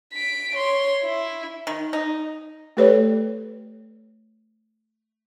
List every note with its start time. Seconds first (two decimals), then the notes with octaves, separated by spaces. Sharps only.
0.13 B6 D7
0.56 C#5 C6
1.02 E4
1.67 D#3
1.93 D#4
2.77 A3 G4 A4 B4 C#5 D5